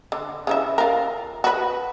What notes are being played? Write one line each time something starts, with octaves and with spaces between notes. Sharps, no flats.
D3
C#3 E3 E5
F4 A#4
F#4 B4